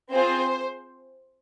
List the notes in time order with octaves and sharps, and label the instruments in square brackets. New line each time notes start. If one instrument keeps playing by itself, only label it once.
[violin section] C4 F4 G#4 C5